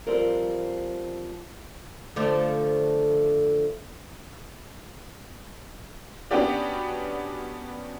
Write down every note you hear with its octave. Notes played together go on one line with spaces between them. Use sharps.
F3 G3 C4 A#4
D3 F3 A3
B3 C#4 D4 F#4 G4 D5